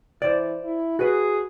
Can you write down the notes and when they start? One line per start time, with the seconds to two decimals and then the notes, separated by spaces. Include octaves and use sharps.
0.22 E3 C5 D5
0.64 E4
0.99 F#4 G#4 B4